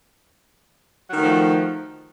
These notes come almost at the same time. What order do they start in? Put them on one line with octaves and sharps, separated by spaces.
F#3 D#3 A3 F3